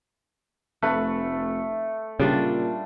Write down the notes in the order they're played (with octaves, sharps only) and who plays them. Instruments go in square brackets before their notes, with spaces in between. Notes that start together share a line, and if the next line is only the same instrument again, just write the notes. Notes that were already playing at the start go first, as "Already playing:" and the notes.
[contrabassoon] F1 [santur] A3 [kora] B4
[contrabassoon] A#2 [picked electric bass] C#3 [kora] G3 D4 F4